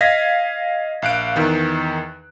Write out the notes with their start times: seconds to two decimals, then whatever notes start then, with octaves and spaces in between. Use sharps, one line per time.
0.01 D#5 F5 G#6 A#6 B6
1.02 A#1 F5 F#6 D7
1.36 E2 D#3